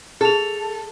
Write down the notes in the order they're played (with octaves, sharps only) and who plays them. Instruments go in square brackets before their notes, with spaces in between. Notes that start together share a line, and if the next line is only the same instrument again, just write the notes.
[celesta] G#4 F7 [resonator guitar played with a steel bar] A4